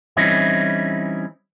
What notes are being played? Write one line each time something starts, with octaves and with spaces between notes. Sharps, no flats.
E3 G3 C4 C#4 D#4 E4